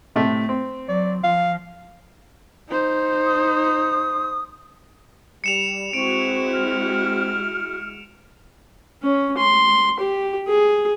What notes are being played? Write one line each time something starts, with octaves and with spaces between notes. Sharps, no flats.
A2 C3 A3
C4
F#3 D5
F3 F5
D#4 C5
D#6
G3 C#7 E7 F7
G#3 C4 E4 F#4 C#6 D7
F6
C#4
C6
G4
G#4